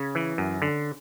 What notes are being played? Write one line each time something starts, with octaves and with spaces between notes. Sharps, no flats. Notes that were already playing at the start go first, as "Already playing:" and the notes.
Already playing: C#3 C#4 C#5
E3
F#2
D3